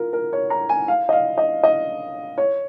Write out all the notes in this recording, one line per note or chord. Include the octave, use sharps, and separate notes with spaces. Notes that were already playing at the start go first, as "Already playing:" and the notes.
Already playing: F4 A#4
A#4
C#5
A#5
G#5
F5
D#5
F5
D#5
D#5
C#5